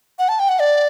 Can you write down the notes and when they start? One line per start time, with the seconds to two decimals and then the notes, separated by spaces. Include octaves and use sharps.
0.19 F#5
0.29 A5
0.39 G5
0.49 F#5
0.60 D5